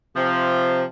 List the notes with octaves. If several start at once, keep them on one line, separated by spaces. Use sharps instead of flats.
C3 F3